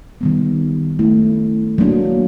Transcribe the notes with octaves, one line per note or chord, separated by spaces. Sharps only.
D#3 G3 B3
A3 C#4 E4
F#3 A#3 D4